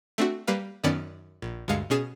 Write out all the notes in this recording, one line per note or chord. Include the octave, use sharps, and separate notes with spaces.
A3 C4 D4 F#4
G3 A#3 B4 F5
F#2 D#3 B3 C#4 D5 A6
A#1
D2 G2 G#3 F5 C#7
B2 C#4 G#4 A6 E7